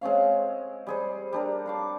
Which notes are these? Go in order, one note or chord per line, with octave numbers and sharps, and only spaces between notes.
G#3 C4 C#4 F5
G3 G#4 C5
G3 D4 A#4
A5 C6 D6